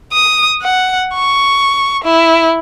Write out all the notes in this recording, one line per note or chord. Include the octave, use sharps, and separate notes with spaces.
D#6
F#5
C#6
E4